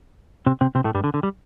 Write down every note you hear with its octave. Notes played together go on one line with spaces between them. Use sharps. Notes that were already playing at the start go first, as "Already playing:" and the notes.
C3 C4
C3 C4
C3 C4
A2 A3
G2 G3
D3
D3
G3